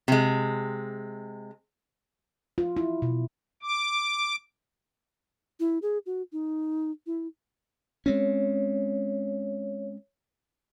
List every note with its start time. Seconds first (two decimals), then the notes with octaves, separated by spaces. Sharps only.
0.08 C3 G#3
2.58 F4
2.77 E4
3.02 B2
3.62 D6
5.60 E4
5.82 G#4
6.06 F#4
6.33 D#4
7.06 E4
8.06 G#3 C4 C#4 C#5